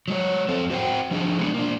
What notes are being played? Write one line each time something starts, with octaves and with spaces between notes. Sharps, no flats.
F#3 G#3 C#5
F2 C4 A4 C5
F#4 C5 E5 F#5 G5
F3 D4 G4 G#4
G#3 B3 D4
A#3 D4